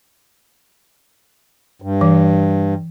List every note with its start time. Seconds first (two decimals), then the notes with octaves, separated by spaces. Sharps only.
1.82 G2
2.01 E3